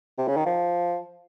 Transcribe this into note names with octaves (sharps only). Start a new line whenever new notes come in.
C3
C#3
D#3
F3